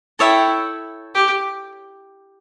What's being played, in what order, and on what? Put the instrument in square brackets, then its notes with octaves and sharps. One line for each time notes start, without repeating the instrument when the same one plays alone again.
[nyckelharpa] E4 [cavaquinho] A4 C#5 E5 G5
[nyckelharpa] G4